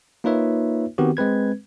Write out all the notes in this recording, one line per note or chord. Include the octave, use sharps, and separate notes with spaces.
A#3 D#4 F4 B4 C#5 E5
D#3 B3 C4 F#4 G4
G#3 C4 B4 G#6